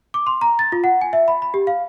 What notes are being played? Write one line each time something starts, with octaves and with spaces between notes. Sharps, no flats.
D6
C6
A#5
A6
F4
F#5
G#5
E5
B5
B5
G4
F5